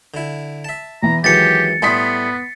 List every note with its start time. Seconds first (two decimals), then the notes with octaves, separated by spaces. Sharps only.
0.14 D3 E4
0.65 E5 A5
1.03 E2 E3 A#5
1.24 D#3 E3 F#3 G#3 G4 A6 C#7
1.82 A2 G3 A3 B3 C6 D#6 B6